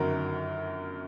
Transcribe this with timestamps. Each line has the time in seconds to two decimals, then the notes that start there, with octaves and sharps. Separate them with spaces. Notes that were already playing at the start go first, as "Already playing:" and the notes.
Already playing: G1 F#2 D#3 F#3 A#4